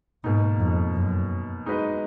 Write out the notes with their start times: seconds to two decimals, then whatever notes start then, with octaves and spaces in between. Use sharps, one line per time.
0.24 G#2 B2 A#3 D#4
0.59 F2
0.94 F#2
1.66 G#3 D#4 F#4 B4 D#5